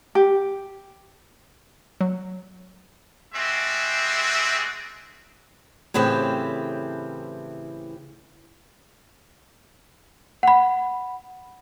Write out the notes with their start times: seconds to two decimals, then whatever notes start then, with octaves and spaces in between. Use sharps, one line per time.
0.15 G4
2.01 F#3
3.34 G3 G#3 C4 F#4 G#4 E5
5.94 A2 C#3 E3 C4 G4
10.43 F#5 B5